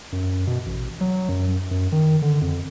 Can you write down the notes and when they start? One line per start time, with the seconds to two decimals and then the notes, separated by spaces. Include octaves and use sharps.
0.12 F#2
0.47 B2
0.66 A1
1.01 F#3
1.29 F#2
1.71 F#2
1.92 D#3
2.22 D3
2.41 F2